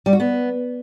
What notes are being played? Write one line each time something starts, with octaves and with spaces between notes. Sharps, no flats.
G3
F#4
B3